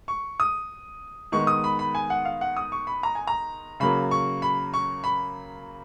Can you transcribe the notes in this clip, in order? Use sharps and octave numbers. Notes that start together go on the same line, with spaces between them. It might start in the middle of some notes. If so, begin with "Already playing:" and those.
C#6
D#6
D#3 G#3 B3 C#6
D#6
B5
B5
G#5
F#5
F5
F#5
D#6
C#6
B5
A#5
G#5
A#5
C#3 F#3 A#3 B5
C#6
B5
C#6
B5